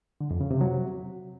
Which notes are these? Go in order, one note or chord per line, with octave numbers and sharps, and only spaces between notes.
D3
F2
C#3
C3
F#3